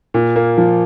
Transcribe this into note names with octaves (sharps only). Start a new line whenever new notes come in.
A#2
A#3
F3